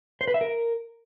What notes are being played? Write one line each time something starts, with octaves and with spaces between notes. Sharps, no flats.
C5
B4
E5
A#4